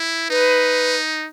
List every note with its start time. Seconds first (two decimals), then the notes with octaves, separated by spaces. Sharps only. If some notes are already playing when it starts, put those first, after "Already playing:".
Already playing: E4
0.30 D#4 B4